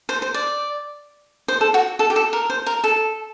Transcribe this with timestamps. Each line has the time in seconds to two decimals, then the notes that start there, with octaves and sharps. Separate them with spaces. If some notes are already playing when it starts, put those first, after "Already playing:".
0.09 C5
0.22 C5
0.34 D5
1.48 C5
1.61 A4
1.74 F#4
1.99 A4
2.10 G4
2.16 A4
2.33 A#4
2.50 C5
2.66 A#4
2.84 A4